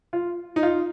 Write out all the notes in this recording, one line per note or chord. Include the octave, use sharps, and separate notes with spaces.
F4
D#4
F4